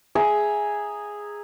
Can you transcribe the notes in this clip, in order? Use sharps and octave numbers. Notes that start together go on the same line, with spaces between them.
G#4 E5 A#5